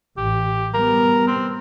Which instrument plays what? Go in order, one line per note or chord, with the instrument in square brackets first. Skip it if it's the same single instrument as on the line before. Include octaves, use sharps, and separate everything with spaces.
[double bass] A1 [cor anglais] G4
[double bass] G3 B3 [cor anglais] A#4
[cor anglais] C4